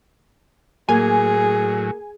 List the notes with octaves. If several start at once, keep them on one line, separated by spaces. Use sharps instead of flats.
A2 F#3 A#3 G#4 G#5